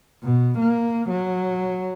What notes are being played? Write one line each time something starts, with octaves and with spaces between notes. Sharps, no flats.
B2
A#3
F#3